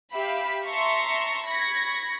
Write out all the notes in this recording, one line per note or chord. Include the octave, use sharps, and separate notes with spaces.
G4 E5 F5 B5
E5 A5 A#5 C6 C#6
B5 C#6 G#6 A#6